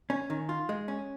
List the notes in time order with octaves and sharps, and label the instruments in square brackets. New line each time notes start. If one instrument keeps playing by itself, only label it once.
[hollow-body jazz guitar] C#4
D#3
F4
G#3
C#4